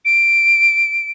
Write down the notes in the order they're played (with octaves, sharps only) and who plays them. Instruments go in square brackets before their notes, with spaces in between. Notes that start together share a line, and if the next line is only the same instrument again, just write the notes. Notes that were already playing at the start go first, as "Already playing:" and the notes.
[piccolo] D7